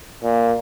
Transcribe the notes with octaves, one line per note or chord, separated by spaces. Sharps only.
A#2